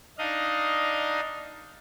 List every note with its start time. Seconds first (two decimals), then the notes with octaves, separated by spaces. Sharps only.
0.18 D4 D#4 D#5 F5